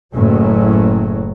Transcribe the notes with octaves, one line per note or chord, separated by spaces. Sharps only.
F#1 A2 F#3